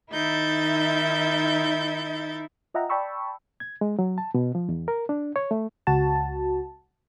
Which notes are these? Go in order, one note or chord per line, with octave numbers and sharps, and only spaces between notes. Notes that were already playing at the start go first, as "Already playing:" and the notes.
D#3 D#4 E4 E5 G6 A6
F4 D#5 E5 F#5 G5 A#5
D5 G5 A5 B5 C#6 E6
G#6
G#3
F#3
A5
B2
F3
E2
A#4
D4
C#5
A3
C#2 F#4 A5